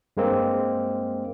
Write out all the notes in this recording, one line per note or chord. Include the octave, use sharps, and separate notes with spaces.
G2 G#3 A#3 C4